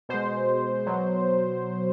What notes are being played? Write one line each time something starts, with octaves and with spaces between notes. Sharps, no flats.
B2 G#3 C5
B2 F#3